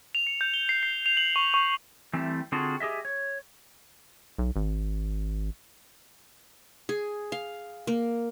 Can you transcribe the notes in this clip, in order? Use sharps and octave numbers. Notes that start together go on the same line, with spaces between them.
F7
C#7
G6
G7
C7
C7
F7
F#7
C#6
C#6
E3 G3 A3 C4
D3 C4 F4 F#4 G#4 A4
G4 G#4 D#5 E5
C#5
B1
G#1
G#4
F5
A#3